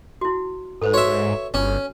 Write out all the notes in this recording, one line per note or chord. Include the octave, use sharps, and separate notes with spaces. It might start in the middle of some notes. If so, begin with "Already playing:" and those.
E4 F#4
G#2 A4 B4 C5
F#4 C#5 E5
G1 C#4